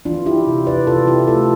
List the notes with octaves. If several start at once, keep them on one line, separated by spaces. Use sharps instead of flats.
E3 D4 F4
E4 G4
C3
B4 D5
C3 F4 A4
E4 G4
A3 F4 A4